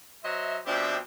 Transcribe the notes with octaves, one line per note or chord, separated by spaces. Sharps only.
F#3 C5 D#5 E5
B2 F3 C4 D4 G4 E5